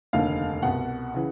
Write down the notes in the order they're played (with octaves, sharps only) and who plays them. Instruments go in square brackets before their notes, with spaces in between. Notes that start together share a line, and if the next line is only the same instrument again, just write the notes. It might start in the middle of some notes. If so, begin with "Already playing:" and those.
[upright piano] F1 D#2 D3 F5
C2 B2 F#5
C#3 E3